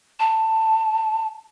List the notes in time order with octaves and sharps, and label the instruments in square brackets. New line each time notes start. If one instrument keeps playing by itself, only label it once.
[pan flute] A5